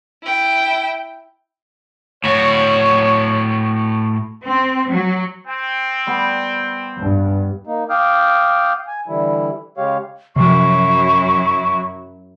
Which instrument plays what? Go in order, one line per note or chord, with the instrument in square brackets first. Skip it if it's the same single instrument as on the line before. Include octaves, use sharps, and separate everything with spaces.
[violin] E4 G5
[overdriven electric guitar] A2 F#4 [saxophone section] C#5
[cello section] C4
F#3
[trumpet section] C4 G5
[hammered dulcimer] G3 B3
[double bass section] G2
[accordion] A#3 D#4
F5 G5 D6 D#6 F6 G6
G#5
D3 E3 G3 E4
C#3 G#3 G4 C#5 F5
[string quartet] F#2 F#3 E4 [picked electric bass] C3 F3 [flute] C#6